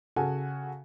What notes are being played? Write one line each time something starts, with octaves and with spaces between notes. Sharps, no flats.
C#3 F#4 A4 G#5